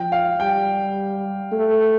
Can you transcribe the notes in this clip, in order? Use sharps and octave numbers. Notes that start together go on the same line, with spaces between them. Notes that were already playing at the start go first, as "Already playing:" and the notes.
Already playing: F3 G5
F5
G3 G5
A3